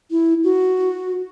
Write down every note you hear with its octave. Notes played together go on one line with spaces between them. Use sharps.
E4
F#4